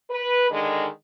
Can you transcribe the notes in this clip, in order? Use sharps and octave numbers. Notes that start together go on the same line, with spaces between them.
B4
D3 D#3 G#3